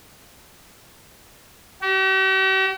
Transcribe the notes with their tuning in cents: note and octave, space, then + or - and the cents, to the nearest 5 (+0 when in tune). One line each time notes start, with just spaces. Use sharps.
G4 -45